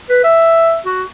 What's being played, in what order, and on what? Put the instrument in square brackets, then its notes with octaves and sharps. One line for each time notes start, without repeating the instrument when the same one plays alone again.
[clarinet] B4
E5
F#4